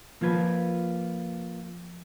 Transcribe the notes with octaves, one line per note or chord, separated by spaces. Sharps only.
F3 A#3 F4 B4 G#6